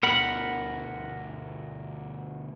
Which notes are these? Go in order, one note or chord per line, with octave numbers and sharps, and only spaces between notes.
D2 B2 A#4 F#5 B5